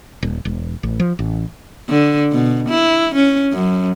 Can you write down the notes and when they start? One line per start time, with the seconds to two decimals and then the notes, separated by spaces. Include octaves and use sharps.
0.23 D#1
0.45 E1
0.83 A1
1.00 F3
1.19 A1
1.89 D3
2.32 B2
2.69 E4
3.15 C#4
3.53 F#2